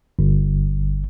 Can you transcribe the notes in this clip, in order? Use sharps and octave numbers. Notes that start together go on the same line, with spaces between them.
G1